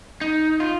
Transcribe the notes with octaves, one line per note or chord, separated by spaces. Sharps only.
D#4
F4